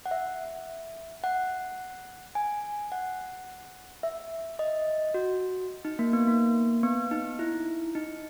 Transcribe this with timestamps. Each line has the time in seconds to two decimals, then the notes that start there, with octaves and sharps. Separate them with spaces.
0.06 F#5
0.11 E5
1.24 F#5
2.35 G#5
2.92 F#5
4.03 E5
4.59 D#5
5.14 F#4
5.85 D#4
5.99 A#3
6.13 B3
6.27 A#3
6.83 B3
7.11 D#4
7.39 E4
7.95 D#4